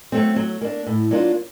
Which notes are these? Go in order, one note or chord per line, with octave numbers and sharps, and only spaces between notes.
F#3 A3 C4
F#3
A#3 D4
A2
F#3 A#3 D4 F4